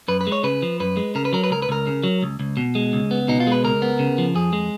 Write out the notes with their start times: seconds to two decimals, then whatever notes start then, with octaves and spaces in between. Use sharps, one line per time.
0.08 F#2 B4
0.21 B4
0.27 G#3
0.32 C#5
0.43 C#3 B4
0.62 F3
0.80 F#2 B4
0.97 G#3
1.15 C#3 A#4
1.25 B4
1.33 F#3 A#4
1.44 B4
1.50 C#2 A#4
1.62 B4
1.69 C#2 A#4
1.87 C#3
2.04 F#3
2.22 C#2
2.40 C#2
2.57 B2
2.75 G#3
2.93 C#2
3.11 B3
3.28 B2 D#4
3.40 F4
3.47 G#3 B4
3.64 C#2 A#4
3.82 B3
3.99 C#3
4.18 F3
4.35 F2 G#4
4.53 G#3